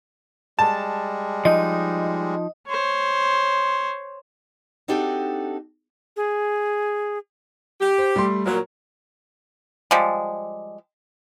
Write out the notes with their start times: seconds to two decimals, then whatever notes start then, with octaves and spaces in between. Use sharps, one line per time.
0.59 G3 G#3 A5
1.45 F3 D#4 D#5
2.68 C5 C#5
4.88 C4 D4 D#4 F#4 G4 A4
6.16 G#4
7.80 G4
7.98 C5
8.16 G3 A3 C6
8.46 A#2 F#3 A#4 C#5
9.91 F3 G3 G#3